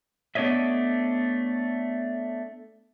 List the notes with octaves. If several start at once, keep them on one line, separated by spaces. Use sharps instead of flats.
A3 B3 D4 C#5 D#5 E5